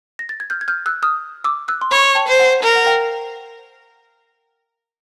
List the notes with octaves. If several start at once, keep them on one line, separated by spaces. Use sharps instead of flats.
A#6
A6
G#6
F6 G6
G#6
F6 G6
E6 F#6
D#6 F6
D6 E6
E6 F#6
C6
C#5 B5 C#6
G5 A5
C5
F#5 G#5
A#4
F#5
F5 G5